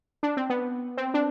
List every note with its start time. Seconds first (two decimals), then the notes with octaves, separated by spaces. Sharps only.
0.23 D4
0.37 C4
0.50 B3
0.97 C4
1.14 D4